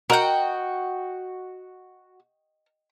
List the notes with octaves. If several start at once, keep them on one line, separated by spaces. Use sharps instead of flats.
F#4 A#4 D#5 F#5 G5